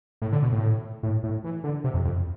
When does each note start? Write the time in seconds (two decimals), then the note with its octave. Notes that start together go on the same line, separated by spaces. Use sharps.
0.22 A2
0.32 D3
0.43 B2
0.52 A2
1.03 A2
1.23 A2
1.44 E3
1.64 D3
1.84 C3
1.94 F2
2.05 F2